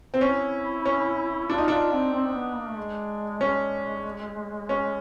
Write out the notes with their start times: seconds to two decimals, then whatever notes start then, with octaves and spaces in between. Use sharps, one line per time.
0.14 C4
0.21 C#4 E4
0.86 C#4
1.49 D4 F4
1.58 D#4
1.68 D4 F4
1.92 C4
2.13 C4
2.27 C4
2.34 B3
2.56 A#3
2.67 A3
2.77 G#3
3.41 G#3 C#4
4.69 C#4